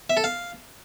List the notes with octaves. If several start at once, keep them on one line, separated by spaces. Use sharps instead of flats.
E5
A4
F5